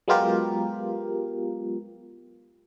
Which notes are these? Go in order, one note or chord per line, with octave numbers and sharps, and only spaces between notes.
F#3 G#3 B3 F4 G4 A#4